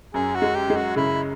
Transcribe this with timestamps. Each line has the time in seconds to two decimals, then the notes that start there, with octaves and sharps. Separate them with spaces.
0.14 F#2 G#4
0.35 F#4
0.42 G#3
0.55 G4
0.70 G#3
0.76 F#4
0.96 C#3 E4